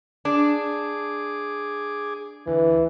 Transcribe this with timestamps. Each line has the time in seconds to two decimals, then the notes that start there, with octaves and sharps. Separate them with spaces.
0.25 D4 G#4 D6
2.47 D2 E3